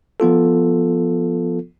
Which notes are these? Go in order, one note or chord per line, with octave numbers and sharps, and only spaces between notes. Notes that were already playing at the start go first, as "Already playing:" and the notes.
F3 B3 F4 A4